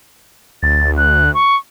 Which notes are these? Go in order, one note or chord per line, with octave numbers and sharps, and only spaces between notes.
D2 A6
F#6
C#6